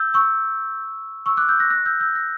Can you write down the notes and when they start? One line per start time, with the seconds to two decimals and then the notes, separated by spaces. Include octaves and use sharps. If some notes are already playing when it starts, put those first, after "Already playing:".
Already playing: E6 G6
0.14 C#6 E6
1.26 C#6 E6
1.37 D6 F#6
1.49 E6 G6
1.60 F#6 A#6
1.70 F#6 A#6
1.86 E6 G6
2.00 E6 G6
2.15 F#6 A#6